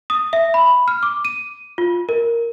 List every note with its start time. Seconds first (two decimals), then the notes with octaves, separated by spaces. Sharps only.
0.10 D#6
0.33 E5
0.54 B5
0.88 F6
1.03 D6
1.25 D#7
1.78 F4
2.09 A#4